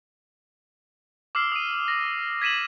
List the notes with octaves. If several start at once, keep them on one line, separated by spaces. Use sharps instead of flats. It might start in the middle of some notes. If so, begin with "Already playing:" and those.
D6 E6 F6 C7
D#6 D#7
A#6
G#6 B6 D#7 E7 F#7